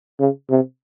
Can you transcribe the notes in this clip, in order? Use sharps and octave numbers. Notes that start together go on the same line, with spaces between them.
C#3
C3